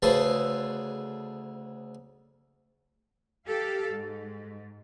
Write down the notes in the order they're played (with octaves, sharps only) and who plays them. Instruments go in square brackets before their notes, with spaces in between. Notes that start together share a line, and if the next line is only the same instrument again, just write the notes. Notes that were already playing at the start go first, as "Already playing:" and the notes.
[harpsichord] D2 C#3 G#4 A4 B4 C5
[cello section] G4 A4 F5
G#2